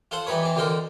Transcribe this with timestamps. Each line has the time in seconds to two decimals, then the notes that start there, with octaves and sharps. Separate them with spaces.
0.11 F4 A4 C5 F#5
0.27 E3 G3 D#4 B4 C#5
0.43 E3 C4
0.56 D2 D3 C4 D#4 A#4